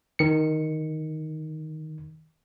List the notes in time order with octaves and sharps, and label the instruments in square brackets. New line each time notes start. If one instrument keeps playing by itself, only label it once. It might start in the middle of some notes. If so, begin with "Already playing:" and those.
[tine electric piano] D#3 C#7